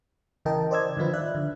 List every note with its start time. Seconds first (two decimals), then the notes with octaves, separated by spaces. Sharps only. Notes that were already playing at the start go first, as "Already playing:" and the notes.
0.45 C#3 E3 A#4 D#5 G5 A5
0.71 C5 D5 D#5 E6 G#6
0.97 D3 D#3 F3 F4 B4
1.13 D5 E5 F#6
1.35 D3